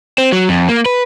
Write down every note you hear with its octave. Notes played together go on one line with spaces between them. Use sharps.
C4
F#3
F2
A#3
B4